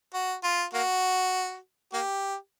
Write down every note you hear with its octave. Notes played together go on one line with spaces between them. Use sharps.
F#4
F4
A#3 F#4
A#3 G4